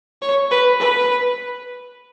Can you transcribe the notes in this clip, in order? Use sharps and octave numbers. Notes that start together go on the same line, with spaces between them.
C#5
B4
B4